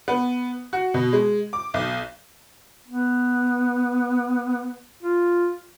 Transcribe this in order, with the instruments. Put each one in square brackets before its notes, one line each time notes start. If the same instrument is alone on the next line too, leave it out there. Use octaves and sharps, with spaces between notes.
[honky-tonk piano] B3
F#4
B2
G#3
D6
B1
[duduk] B3
F4